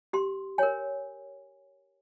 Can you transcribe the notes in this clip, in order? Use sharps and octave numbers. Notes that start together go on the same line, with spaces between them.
G4 C6
A#4 C#5 G#5